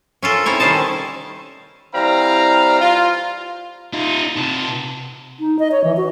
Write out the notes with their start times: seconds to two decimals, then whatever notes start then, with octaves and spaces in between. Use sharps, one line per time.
0.23 C#4 F4 A4 A#4
0.46 C4 D#4 E4 C#5
0.60 D#3 G3 C#4 C5 D#5 A5
1.94 E3 G3 C4 F5 A#5
2.80 F4
3.93 D#4 F4
4.36 C3 A5
5.40 D#4
5.59 D#5
5.72 C#5
5.84 E3
5.97 F#4